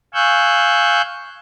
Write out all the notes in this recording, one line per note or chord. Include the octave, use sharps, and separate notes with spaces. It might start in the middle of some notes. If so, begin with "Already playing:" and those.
F5 G#5 C#6 E6 F#6 G6